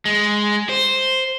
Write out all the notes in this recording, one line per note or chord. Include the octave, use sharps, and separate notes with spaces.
G#3
C5